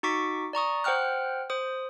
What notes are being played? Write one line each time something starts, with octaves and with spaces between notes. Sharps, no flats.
D#4 F#4 C#6 D6 B6
D5 A#5 C#6 D#6
C5 F#5 G5 F6 F#6
C5 D#6